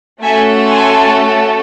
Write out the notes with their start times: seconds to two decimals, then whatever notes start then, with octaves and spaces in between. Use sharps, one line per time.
0.22 A3 C#4 F#4 A4 E5 G#5
0.66 G#5 C6